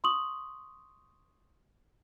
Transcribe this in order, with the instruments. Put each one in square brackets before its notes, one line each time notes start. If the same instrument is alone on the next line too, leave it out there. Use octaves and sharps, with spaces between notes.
[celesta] C6 C#6 D#6 F#7